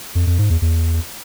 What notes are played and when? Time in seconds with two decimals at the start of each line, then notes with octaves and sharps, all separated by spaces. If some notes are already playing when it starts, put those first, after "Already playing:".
0.15 F2
0.27 F2
0.38 G#2
0.50 E2
0.62 E2